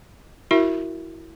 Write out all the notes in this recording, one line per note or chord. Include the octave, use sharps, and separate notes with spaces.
E4 F#4 A#4 E5